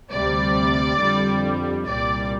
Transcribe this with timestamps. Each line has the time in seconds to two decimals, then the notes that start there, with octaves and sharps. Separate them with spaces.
0.11 D2 C3 G3 D5
0.99 F2 D3 G3
1.87 C2 A#2 G3 D5